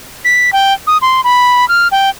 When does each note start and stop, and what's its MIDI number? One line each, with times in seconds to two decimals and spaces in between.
0.25 0.50 95
0.53 0.73 79
0.87 0.98 87
1.02 1.21 84
1.24 1.67 83
1.68 1.88 89
1.92 2.10 79